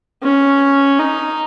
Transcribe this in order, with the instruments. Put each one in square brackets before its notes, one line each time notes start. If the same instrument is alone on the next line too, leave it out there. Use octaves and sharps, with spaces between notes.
[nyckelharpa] C#4
D#4